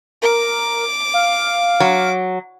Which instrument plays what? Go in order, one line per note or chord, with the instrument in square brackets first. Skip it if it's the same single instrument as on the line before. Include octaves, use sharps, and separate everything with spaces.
[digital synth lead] A#4 [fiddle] D6
[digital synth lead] F5
[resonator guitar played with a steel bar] F#3